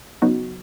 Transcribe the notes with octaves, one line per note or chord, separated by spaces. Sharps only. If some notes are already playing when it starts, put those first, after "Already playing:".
C#3 F#3 B3 D#4 F#4